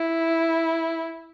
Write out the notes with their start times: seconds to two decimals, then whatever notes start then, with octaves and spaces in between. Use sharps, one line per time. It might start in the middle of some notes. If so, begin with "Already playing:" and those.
Already playing: E4